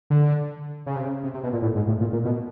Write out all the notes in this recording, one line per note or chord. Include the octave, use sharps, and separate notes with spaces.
D3
C#3
C3
C#3
C3
C3
B2
A#2
A2
G#2
A2
A#2
A#2
B2